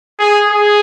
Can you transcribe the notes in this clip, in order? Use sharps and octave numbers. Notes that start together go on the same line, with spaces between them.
G#4
G#4